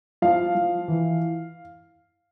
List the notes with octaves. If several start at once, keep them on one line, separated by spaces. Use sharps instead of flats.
F3 F5
F3
E3